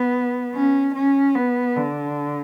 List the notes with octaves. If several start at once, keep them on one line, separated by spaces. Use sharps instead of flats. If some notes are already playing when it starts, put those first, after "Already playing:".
Already playing: B3
C#4
C#4
B3
D3